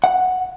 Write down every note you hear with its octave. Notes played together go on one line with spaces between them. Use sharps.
F#5